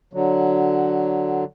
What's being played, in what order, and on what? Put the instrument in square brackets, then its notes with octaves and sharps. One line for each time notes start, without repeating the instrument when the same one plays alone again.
[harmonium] D3 F#3